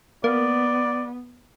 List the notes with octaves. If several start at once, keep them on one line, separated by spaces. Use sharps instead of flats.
A#3 B3 D5